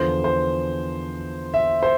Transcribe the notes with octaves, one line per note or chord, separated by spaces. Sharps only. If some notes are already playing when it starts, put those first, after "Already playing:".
Already playing: E2 D3 F3 C5
C5
E5
C5